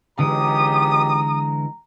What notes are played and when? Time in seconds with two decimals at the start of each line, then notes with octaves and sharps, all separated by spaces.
0.19 C#2 D3 E3 G#3 D#4 G4 A#5 D#6